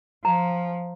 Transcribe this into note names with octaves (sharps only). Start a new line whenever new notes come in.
F3 A#5